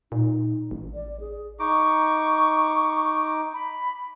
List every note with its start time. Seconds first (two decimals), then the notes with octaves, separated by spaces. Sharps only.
0.12 A#2 D#4
0.71 A1
0.95 D5
1.20 G#4
1.59 D#4 C#6 D6
3.53 B5